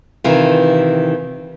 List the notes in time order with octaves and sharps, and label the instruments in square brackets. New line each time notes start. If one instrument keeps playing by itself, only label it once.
[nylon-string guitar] C3 D#3 E3 F4